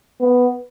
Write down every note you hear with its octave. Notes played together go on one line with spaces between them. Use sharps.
B3